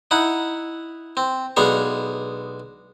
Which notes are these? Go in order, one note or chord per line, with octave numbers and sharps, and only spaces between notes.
D#4 E4 F#5
C4
B1 G#3 B3 D4 F5